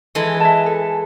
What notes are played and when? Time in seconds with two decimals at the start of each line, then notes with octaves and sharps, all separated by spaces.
0.15 E3 G#3 A4
0.40 E5 A5
0.66 A4